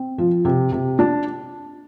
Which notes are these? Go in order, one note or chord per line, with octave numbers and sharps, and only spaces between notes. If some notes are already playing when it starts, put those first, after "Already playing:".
Already playing: C4
F3
C3
C3
D4